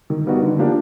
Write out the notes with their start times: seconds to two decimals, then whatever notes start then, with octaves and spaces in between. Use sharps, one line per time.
0.10 D#3
0.27 G3 B3 D#4 F#4
0.43 D3
0.58 F3 A#3 D4 G4